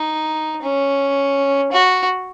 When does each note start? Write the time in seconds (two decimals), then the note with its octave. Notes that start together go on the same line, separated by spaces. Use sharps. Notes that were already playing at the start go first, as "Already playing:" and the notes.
Already playing: D#4
0.62 C#4
1.72 F#4